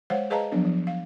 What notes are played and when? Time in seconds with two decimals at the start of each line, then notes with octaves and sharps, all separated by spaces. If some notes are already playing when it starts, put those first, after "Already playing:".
0.10 G#3 C5 C#5 F5 F#5
0.30 G#4 B4 D#5 F5 A5 A#5
0.52 F3 F#3 B3 D4
0.65 F3
0.87 F5